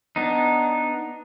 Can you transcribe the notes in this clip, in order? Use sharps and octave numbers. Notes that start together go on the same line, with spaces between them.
B3 D4 D#4